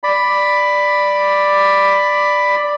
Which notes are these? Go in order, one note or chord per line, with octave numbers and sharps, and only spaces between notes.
D5 B5